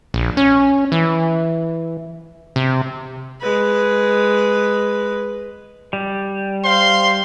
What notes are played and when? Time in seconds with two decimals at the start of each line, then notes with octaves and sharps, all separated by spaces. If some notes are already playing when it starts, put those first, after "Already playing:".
0.14 A#1
0.37 C#4
0.92 E3
2.56 C3
3.41 G#3 B4
5.93 G3
6.65 C5 F5 C6